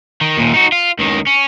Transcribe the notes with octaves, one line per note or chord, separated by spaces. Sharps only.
D#3
D#2 A#2
D#4 F#4
F4
C#2 D#3
C#4